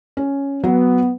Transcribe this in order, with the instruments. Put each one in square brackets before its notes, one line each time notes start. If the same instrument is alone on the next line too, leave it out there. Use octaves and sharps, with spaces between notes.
[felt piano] C#4
[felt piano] F#3 [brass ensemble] B3